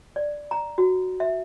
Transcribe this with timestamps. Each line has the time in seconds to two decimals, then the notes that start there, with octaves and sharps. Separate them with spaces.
0.16 D5
0.51 A#5
0.78 F#4
1.20 E5